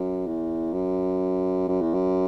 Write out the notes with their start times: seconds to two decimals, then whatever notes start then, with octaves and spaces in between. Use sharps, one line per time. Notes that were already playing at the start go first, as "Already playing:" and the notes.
Already playing: F#2
0.27 E2
0.73 F#2
1.68 F#2
1.81 E2
1.94 F#2